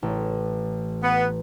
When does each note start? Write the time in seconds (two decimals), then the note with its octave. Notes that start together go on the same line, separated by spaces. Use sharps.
0.02 A1
1.03 B3